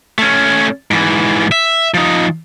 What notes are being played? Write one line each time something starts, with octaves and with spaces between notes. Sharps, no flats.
A3 C#4
G#2 E3
E5
F3 D#4